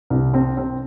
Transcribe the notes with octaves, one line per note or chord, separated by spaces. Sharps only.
C2
C4
C4